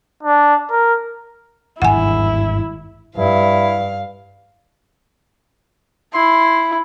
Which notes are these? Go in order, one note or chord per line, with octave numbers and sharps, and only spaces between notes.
D4
A#4
G#1 E2 G2 E4 F#5 G#5
G2 E4 F5
E4 C6